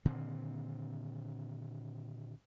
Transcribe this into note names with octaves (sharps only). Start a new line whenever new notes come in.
A#2 D3 D#3 C4